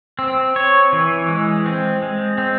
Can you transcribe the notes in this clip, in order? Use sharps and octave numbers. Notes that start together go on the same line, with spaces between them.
C4
C#5
E3
G#3
C4
G#3
C4